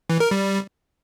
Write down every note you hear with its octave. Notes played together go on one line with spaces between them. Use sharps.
E3
A#4
G3